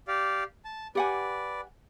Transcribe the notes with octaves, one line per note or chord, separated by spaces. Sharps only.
G4 D5 F5
A5
G4 B4 D5 F#5 G#5